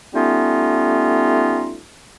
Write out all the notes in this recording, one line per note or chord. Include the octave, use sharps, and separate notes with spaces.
G3 A3 B3 C#4 D#4 F4